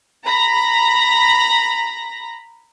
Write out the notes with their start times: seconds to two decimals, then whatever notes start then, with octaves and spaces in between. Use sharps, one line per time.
0.25 A#5 B5 A#6